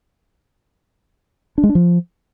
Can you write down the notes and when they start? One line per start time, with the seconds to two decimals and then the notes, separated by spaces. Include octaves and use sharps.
1.58 D4
1.63 G#3
1.69 D4
1.75 F3